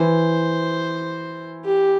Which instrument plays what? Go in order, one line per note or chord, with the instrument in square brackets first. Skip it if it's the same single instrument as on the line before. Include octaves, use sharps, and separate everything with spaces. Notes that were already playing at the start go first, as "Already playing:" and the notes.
Already playing: [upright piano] E3 [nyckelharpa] C5
[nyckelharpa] G4